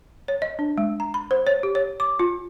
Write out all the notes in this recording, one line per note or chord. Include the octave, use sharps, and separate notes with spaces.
C#5
D#5
D4
G#3
A#5
B5
C5
C#5
G4
C#5
D6
F4